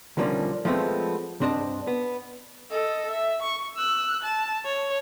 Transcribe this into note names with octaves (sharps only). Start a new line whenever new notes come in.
B1 D3 F3 G3 A#3 C#4
F3 G#3 A3 B3 C4
C2 G2 C4 D4 D#5 A5
B3
A4 D#5
E5
C#6
E6 F#6
A5
C#5